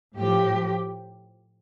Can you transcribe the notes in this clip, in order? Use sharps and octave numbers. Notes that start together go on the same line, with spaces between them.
A2 F3 G4